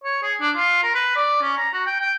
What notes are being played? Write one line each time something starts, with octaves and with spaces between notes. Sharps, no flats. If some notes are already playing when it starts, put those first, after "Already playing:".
C#5
G#4
D4
F4
A#4
B4
D5
C#4
A#5
F#4
G5
G5